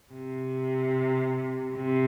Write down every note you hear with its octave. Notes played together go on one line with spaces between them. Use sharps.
C3
C3